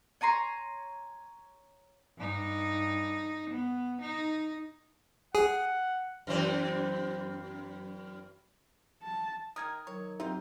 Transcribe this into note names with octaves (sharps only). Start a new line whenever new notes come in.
C#5 G#5 A#5 C6
G2 D#4
B3
D#4
G#4 F#5
F#2 E3 C4
A5
D#3 D#4 A#4 D#6 G#6
D#3 F#3 C#5
F#3 C4 D#4 F4 G4 C5 E5